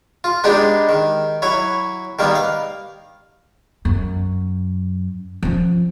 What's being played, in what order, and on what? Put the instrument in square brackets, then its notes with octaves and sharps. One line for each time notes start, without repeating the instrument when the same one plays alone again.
[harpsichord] F4
G#3 B3 D4 D#4 G4
D#3
F#3 E4 C#5
D#3 G3 A#3 B3
F5
[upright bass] F#2
F3 C#4